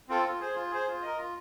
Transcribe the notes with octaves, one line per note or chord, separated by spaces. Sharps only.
C4 F4 A4
F4
G#4 C5
F4
G#4 C5
F4
A#4 D#5
F4